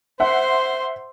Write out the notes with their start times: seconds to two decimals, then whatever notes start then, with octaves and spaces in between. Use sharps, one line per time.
0.20 C5 E5 F#5 C6